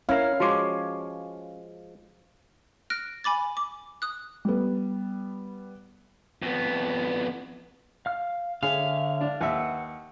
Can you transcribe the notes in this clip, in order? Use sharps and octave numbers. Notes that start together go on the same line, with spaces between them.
C#4 E4 A#4 F5
F3 G#3 F#4 C#5 D6
F6 F#6 A#6 D7
G#5 B5 D6 A6
D6
D#6 F#6
G3 B3
F2 B3
F5 F6
D3 G#4 C#5 E5 F5
D4
D#2 B4 E5 F#5